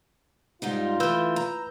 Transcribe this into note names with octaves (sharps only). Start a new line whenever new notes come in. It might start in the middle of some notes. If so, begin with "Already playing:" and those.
G#2 G3 D#4 F4
E3 A3 B4 E6 G6
A#5